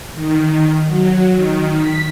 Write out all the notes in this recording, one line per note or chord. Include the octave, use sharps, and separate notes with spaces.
D#3
F#3
D#3
B6